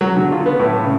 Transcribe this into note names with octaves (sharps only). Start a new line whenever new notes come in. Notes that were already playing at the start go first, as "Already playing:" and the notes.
F#3
D3
F4
B3
A2
C#3